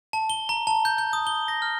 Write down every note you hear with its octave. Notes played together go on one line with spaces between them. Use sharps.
A5
G7
A#5
A5
G6
G6
D#6
G7
A#6
F6